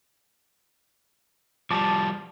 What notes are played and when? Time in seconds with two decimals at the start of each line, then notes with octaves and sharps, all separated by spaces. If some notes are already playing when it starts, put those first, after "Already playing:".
1.71 F3 G3 A5 D6